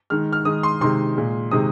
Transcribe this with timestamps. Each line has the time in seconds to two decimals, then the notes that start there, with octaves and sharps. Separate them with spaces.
0.10 D#3 G#3 F6
0.33 F6
0.45 D#3 G#3 D#6
0.63 C6
0.81 C3 D#3 G#3 C6
1.16 A#2 G#3
1.51 C3 D#3 G#3 D#6